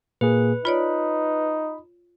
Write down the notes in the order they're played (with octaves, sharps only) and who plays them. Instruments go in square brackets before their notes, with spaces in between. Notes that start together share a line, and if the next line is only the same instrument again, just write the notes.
[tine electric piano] A#2 A#3 G#4 [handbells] B4
[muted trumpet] D#4 [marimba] F4 C#5 D5 [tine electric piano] B5